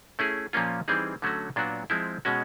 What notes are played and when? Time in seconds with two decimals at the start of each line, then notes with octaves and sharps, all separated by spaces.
0.19 A3 C#4 E4 G#4
0.53 A#2 F3 A#3 C#4 F4
0.88 E3 G3 C4 D#4 G#4
1.22 D3 F#3 A3 C#4 F#4
1.56 A#2 F#3 B3 D4 F#4
1.90 F3 G#3 C4 E4
2.25 B2 G#3 C#4 F#4